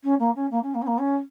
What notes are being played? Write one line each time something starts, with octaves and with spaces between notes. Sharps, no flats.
C#4
A#3
C#4
A#3
C#4
A#3
C#4
A#3
C#4